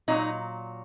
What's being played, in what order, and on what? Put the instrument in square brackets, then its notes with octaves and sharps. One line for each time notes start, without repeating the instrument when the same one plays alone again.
[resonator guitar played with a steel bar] A#2 F#3 D#4